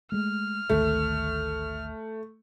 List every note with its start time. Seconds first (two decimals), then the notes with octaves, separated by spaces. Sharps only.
0.12 G#3 A3 F6
0.69 G#1 D2 D#3 A3